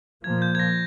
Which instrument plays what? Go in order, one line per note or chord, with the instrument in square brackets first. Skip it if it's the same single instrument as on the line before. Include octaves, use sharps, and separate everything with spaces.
[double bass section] A#2 F3 A#3 [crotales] G#6
[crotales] G6
G#6
A#6